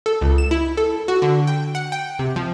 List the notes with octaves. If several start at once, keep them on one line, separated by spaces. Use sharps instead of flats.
A4
C#2
E7
E4
A4
F#4
D3
G5
F#5
G5
C3
F3